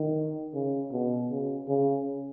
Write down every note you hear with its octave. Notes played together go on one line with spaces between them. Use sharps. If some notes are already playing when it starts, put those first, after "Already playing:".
Already playing: D#3
C#3
B2
C#3
C#3